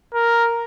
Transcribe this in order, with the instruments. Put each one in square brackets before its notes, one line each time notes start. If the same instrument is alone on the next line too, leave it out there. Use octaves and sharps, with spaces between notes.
[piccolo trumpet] A#4